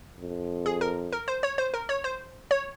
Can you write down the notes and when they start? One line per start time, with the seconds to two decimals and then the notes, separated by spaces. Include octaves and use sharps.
0.20 F2
0.66 G#4
0.81 A#4
1.13 A#4
1.28 C5
1.43 C#5
1.58 C5
1.74 A#4
1.89 C#5
2.04 C5
2.51 C#5